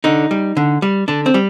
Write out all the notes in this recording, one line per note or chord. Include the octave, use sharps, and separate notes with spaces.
D3 D#4
G3
D3
G3
D3 D4
C4
G3